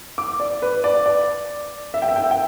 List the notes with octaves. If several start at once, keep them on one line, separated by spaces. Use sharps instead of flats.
D6
D5
B4
D5
D5
E5
G5
E5
G5
E5
G5